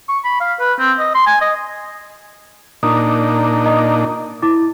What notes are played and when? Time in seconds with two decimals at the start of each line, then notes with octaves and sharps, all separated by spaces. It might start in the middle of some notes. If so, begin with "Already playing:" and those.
0.09 C#6
0.24 B5
0.40 F5
0.59 B4
0.79 C4
0.99 D#5
1.15 C6
1.26 G#5
1.41 D#5
2.83 A#2 D4 D#4 D#6
3.66 D#5 A#5 D#6
4.42 E4 D6 A6